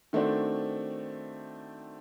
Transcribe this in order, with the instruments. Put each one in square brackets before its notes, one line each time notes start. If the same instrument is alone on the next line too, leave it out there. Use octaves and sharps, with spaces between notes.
[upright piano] D#3 A3 C4 D4 F#4 C5